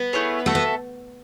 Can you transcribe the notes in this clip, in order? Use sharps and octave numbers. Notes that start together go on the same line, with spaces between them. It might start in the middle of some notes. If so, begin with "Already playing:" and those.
Already playing: B3
A3 E4 G#4 C#5
A3 F#4 A4 E5
B3